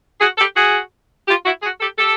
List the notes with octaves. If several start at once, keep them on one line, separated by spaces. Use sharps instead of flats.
F#4 G#4
G4 A4
F#4 G#4
F4 G4
E4 F#4
F#4 G#4
G4 A4
G4 A4